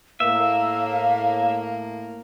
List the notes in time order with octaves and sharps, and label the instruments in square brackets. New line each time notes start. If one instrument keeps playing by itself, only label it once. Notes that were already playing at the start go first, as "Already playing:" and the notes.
[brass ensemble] A2 A#3 [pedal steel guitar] E5 [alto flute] F5